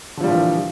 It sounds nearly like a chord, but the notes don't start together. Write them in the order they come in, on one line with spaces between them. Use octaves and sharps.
D3 F3 G3 A#2 E3